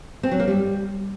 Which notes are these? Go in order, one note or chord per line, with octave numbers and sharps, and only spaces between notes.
C4
F#3
A#3
G3